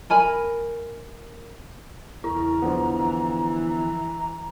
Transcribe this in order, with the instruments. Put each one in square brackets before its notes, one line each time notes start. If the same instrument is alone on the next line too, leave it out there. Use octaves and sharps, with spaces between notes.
[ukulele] A#4 G#5 B5
[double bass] E2 C#3 [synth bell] E4 [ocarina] A#5
[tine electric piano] D3 F3 B3
[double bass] E3
[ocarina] A#5